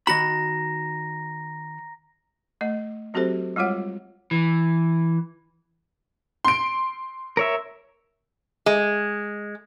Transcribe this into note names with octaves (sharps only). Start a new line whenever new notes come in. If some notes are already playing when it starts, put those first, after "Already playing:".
D#3 F#4 A#5 B5 A#6
A3 D#5
F#3 C4 F#4 G4 A4 C5
G3 G#3 F4 C#5 F#5
E3
C6 D7
A#4 C#5 E5
G#3